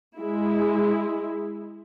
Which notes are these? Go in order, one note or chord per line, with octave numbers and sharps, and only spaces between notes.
G#3 E4